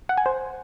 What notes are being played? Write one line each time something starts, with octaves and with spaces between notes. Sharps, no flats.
F#5
G#5
C5